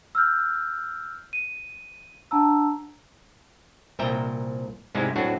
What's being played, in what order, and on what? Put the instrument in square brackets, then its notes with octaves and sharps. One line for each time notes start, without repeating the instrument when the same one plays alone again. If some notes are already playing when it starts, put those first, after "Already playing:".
[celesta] E6 F6 G6
D#7
D4 F#5 A5 A#5 E6
[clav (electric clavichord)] C2 A#2 E5 G5 A#5
G#2 C3 G3 G#3 D#4 E4
A2 F#3 C4 D4 F#4